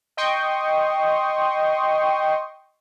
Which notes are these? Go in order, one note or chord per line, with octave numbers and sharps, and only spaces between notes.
D#5 G5 C6 C#6 D#6